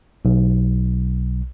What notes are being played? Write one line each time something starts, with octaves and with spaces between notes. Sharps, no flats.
B1